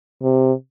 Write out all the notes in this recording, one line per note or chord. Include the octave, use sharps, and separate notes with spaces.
C3